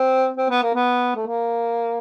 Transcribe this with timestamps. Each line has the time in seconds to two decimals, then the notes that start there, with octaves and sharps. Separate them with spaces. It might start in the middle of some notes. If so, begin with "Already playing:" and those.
Already playing: C4
0.37 C4
0.50 B3
0.62 A#3
0.74 B3
1.16 A3
1.27 A#3